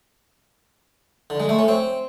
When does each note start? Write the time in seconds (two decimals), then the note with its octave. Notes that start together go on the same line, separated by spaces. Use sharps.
1.30 D3
1.40 G#3
1.49 A3
1.59 C#4
1.68 C4